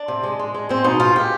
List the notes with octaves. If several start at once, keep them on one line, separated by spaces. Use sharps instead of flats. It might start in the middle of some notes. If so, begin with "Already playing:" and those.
Already playing: D4
C3
G#3
G#3
G#3
G#3 C4
B2 D#4
G#3 F4
G#3 G4